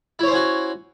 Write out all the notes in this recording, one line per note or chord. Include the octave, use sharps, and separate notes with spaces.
C#4 E4 F#4 C5 C#5